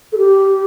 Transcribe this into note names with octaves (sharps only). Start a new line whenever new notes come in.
A4
G4